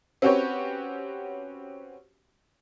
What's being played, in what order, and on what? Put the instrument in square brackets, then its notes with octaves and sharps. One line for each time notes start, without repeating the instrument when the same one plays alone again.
[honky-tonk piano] C4 C#4 F#4 G4 B4 C#5